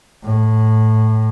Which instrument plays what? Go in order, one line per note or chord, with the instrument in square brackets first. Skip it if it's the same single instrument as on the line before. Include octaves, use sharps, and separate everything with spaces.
[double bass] A2